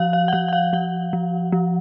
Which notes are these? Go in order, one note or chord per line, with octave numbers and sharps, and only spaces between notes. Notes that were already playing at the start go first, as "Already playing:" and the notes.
Already playing: F3 F5
F5
F#5
F3 F5
F#5
F5
F3 F#5
F3
F3